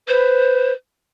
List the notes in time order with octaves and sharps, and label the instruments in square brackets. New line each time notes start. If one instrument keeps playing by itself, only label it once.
[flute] B4 [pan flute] C5